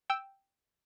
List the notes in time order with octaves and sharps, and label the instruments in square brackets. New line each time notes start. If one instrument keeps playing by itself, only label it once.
[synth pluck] G5 E6